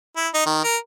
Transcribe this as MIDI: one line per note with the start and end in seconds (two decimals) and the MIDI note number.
0.16 0.28 64
0.34 0.43 63
0.46 0.60 51
0.64 0.76 70